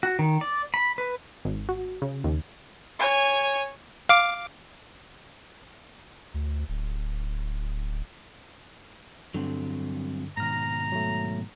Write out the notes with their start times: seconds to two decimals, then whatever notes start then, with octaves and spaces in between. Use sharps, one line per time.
0.03 F#4
0.19 D#3
0.41 D5
0.74 B5
0.98 B4
1.45 G#1
1.69 F#4
2.02 C#3
2.24 D#2
2.99 C#5 G#5
4.09 F5 D6
6.34 D2
6.68 D1
9.34 G2 D3 F#3 G3 C4
10.37 G#2 B2 D#3 A#5 F6 A#6
10.92 F#3 A3